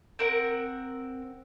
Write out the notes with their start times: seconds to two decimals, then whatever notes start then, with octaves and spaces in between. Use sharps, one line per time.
0.19 C4 A#4 F#5